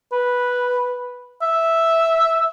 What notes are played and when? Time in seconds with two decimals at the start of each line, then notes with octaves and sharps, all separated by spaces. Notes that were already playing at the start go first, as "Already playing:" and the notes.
0.12 B4
1.42 E5